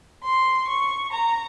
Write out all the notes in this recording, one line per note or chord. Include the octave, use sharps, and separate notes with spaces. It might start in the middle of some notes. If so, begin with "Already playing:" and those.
C6
C#6
A#5